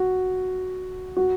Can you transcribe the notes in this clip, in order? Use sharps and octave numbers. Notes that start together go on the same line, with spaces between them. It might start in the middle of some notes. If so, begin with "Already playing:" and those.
Already playing: F#4
F#4